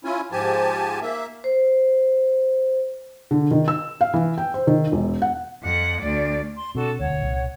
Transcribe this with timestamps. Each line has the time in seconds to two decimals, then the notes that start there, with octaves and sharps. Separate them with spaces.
0.04 C#4 E4 F4 G#5
0.32 G#2 F3 G4 G#5 A5
1.02 A#3 E5
1.44 C5
3.31 D3
3.51 D#3
3.68 E6
4.01 F5
4.14 E3
4.38 G5
4.54 C5
4.67 D#3
4.92 E1
5.22 F#5
5.63 F2 F#5
6.01 D2 D5
6.55 C6
6.75 B2 C4 D4 F#4 A4
6.99 E1 D2 C#5 F#5
7.21 C2 A#2